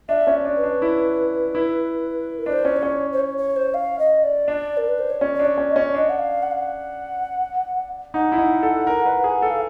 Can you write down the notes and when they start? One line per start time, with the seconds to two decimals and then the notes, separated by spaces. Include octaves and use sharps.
0.09 D4 E5
0.27 C#4
0.45 D4
0.57 B4
0.64 D4
0.82 E4
1.55 E4
2.39 A#4
2.46 D4 B4
2.52 C5
2.65 C#4
2.77 C#5
2.83 C#4
3.13 C5
3.20 C#5
3.38 C#5
3.56 C5
3.74 F5
3.99 D#5
4.23 D5
4.48 D4
4.77 A#4
4.88 B4
4.99 C5
5.10 C#5
5.21 C#4 D5
5.35 D4 D5
5.45 C#5
5.58 C#4
5.70 D#5
5.76 C#4
5.82 D5
5.95 D4 D#5
6.09 F#5
6.19 F5
6.43 F#5
6.51 F5
6.58 F#5
8.14 D#4 F#5
8.32 E4
8.38 D#4
8.63 A4
8.87 A#4
9.06 B4
9.24 G#4
9.42 A4
9.50 F5